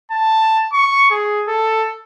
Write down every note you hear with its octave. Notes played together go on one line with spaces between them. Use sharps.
A5
C#6
G#4
A4